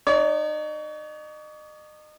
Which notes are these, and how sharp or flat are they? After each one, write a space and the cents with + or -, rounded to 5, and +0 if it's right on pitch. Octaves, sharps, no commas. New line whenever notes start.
D#4 -35 C#5 +35